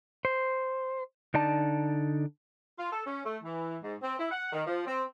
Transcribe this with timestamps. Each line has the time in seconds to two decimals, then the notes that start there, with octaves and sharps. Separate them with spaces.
0.25 C5
1.34 D3 D#4 D5 A5
2.78 F4
2.91 A4
3.06 C#4
3.24 A3
3.44 E3
3.82 G#2
4.02 C4
4.19 E4
4.30 F#5
4.52 D#3
4.66 F3
4.86 C4